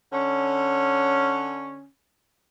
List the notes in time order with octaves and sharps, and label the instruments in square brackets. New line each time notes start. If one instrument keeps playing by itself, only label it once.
[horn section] D3 C#4